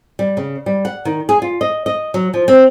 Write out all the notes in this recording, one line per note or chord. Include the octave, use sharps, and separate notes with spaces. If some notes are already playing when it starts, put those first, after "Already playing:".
G3
C#3
G3
F#5
D#3
G#4
F4
D#5
D#5
F#3
F3
C4